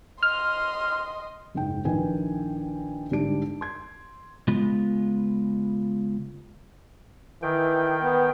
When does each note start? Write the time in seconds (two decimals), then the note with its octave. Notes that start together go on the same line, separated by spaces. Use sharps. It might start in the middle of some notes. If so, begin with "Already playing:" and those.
0.23 D#5 C6 F6
1.54 F#1 G#2 G5
1.85 A#1 D#3 E3 B4 G5 G#5
3.11 G1 G#2 G3 D4 D7
3.61 C6 G#6
4.48 C#3 G#3 B3 F4
7.43 D#3 E3 G5
8.02 B3